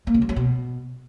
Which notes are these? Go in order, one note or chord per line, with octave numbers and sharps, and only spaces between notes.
A#3
C#3
G3
F#3
B2